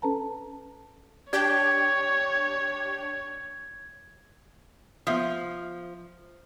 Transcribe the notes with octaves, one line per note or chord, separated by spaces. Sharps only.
C#4 A4 B4 A5 A#5
D4 G4 C#5 G5 G#6
F3 B3 E5 D#6